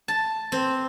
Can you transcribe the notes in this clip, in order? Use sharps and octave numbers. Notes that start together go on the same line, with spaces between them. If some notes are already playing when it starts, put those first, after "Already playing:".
A5
C4